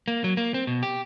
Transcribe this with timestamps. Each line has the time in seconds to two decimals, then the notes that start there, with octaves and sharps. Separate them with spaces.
0.08 A#3
0.24 F#3
0.37 A#3
0.54 C4
0.67 B2
0.83 G4